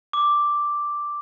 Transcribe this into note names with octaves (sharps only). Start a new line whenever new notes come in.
D6